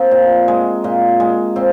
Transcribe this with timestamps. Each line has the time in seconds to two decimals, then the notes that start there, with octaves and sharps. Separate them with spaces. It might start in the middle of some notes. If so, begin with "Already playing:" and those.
Already playing: A#3 C4 D#4 D#5
0.11 A#2
0.48 G#3
0.84 A#2
1.20 G#3
1.56 A#2 C4